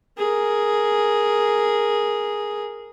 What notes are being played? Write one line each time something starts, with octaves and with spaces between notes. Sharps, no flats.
G#4 A#4